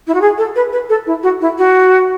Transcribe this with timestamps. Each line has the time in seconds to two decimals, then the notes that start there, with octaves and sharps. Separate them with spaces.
0.07 E4
0.14 F#4
0.21 G#4
0.37 A4
0.55 B4
0.72 B4
0.89 A4
1.06 E4
1.23 F#4
1.40 E4
1.57 F#4